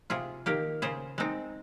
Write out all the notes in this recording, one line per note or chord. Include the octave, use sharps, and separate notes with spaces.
C3 F4 G#4
D#3 A#3 G4 A#4
C#3 G#4 C5
G#3 C4 D#4